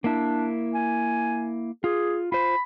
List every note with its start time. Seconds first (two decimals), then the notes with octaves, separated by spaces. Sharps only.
0.04 A#3 D4 E4
0.74 G#5
1.84 F4 G#4
2.32 F4 C5 B5